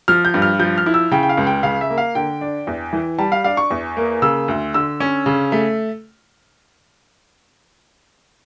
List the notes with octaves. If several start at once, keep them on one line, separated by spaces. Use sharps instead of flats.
F3 F6
G6
G2
F6
F3 G6
F6
E4
E6
C#3 G5
G5
F5
C#2
G5
C#3 F5
E5
A#3
F5
D3 G5
D4
E2
E3
G3 A5
F5
D4 F5
C#6
E2
A#3
C#3 E6
D2
D3 E6
C#4
C#3
A3